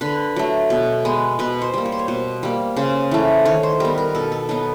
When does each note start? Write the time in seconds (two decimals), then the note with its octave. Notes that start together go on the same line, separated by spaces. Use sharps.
0.01 D3 B4
0.36 F#3 A3
0.70 B2
1.05 G#3 B3
1.39 B2 B4
1.62 C5
1.74 G3 A#3
1.85 C#5
1.92 C5
1.99 C#5
2.08 B2 C5
2.43 G3 A#3
2.77 C#3 C5
3.11 E3 A3
3.45 D#3 C#5
3.63 C5
3.80 G3 B3 A#4
3.98 A#4
4.15 B2 A4
4.32 A4
4.49 F#3 B3 D#4